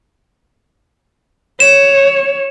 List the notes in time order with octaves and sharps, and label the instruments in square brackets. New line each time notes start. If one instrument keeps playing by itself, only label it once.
[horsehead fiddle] C#5 [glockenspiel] E7